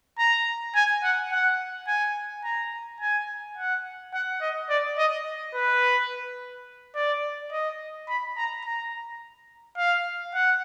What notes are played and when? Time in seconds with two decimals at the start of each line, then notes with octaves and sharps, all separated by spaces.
0.18 A#5
0.75 G#5
1.03 F#5
1.31 F#5
1.87 G#5
2.44 A#5
3.00 G#5
3.57 F#5
4.13 F#5
4.41 D#5
4.69 D5
4.98 D#5
5.54 B4
6.95 D5
7.52 D#5
8.09 B5
8.37 A#5
8.65 A#5
9.77 F5
10.34 F#5